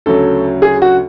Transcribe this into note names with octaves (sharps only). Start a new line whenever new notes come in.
D2 C#3 F#3 A4
G#4
F#4